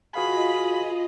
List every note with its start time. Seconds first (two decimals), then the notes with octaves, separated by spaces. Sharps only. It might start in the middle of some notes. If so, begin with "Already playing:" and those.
0.15 F4 F#4 G#4 B4 D#5 F5 B5